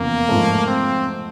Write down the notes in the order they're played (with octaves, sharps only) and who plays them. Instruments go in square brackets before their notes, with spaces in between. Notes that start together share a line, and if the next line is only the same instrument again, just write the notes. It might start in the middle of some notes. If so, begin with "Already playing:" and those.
Already playing: [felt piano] F1 E2 C#3 F3 [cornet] A#3
[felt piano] G#2 F3 A3
[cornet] C4